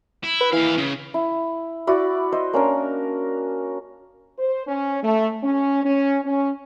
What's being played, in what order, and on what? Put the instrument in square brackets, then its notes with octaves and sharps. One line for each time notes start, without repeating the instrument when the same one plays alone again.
[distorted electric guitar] E4
[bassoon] B4
[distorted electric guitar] D#2 F5 [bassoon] E3
[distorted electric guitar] C#3
[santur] E4
E4 F#4 D5
C5 D#5
A#3 C#4 D4 A#4
[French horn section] C5
C#4
A3
C#4
C#4
C#4